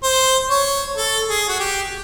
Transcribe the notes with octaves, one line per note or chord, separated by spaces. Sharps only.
C5
C#5
A4
G#4
F#4
G4